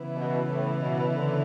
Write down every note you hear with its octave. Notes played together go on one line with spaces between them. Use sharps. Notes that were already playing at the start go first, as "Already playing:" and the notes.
Already playing: C#3 E3 B3 E4
B2
A2
B2
D3